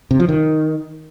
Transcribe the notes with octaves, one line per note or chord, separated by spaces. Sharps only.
C3
F3
D#3